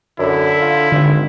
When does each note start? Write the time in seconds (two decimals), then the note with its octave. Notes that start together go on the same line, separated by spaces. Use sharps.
0.19 F#2 D3 E4
0.61 F4
0.92 G#1 D3